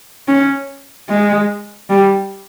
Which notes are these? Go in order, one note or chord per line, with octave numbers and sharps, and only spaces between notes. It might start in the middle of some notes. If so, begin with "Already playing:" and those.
C#4
G#3
G3